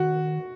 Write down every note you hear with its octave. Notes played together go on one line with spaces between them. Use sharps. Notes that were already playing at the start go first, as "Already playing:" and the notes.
Already playing: D#3 F#4